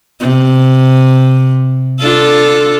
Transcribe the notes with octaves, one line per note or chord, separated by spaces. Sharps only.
C3
D4 F4 A4